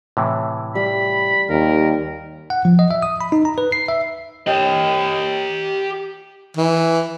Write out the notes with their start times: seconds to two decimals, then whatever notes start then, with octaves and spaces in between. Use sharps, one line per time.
0.17 A2 C3 E3
0.75 G3 B5
1.49 D#2 A#4
2.50 F#5
2.65 F3
2.79 D#5
2.91 E5
3.02 D#6
3.21 B5
3.32 D#4
3.45 A#5
3.58 B4
3.72 C7
3.88 E5
4.47 G4 D#5
6.57 E3